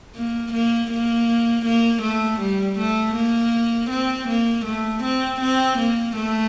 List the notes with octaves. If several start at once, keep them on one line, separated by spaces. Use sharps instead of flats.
A#3
A#3
A#3
A#3
A3
G3
A3
A#3
C4
A#3
A3
C4
C4
A#3
A3